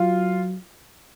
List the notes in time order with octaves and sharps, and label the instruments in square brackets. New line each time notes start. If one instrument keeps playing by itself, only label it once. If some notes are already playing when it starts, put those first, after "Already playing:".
Already playing: [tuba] F#3 [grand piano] F4